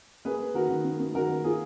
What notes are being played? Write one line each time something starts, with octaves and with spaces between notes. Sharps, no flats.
A#3 G#4 B4
A#3
D#3 F#4 A#4
D#3
A#3
A#3
D#3 F#4 A#4
D#3
A#3 F4 G#4